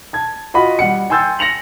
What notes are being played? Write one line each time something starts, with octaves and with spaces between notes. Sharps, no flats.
A5 G#6
F4 F#4 D#5 F#5 B5
G3 F#5 C#7
G5 G#5 C6 E6 G6 A6
A#6 C#7 F7 F#7